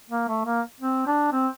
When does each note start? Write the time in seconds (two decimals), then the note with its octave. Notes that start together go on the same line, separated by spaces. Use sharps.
0.10 A#3
0.28 A3
0.46 A#3
0.80 C4
1.07 D4
1.32 C4